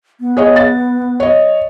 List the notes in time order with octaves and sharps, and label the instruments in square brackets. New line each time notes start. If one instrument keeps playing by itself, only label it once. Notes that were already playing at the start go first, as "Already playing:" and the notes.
[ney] B3
[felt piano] G#4 C#5 D#5
A6
C#5 D#5